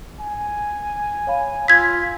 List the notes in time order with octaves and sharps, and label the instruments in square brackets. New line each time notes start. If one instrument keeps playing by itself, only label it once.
[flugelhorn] G#5
[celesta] C#5 F5 B5
[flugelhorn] F4 [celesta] G#5 E6 [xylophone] G#6 B6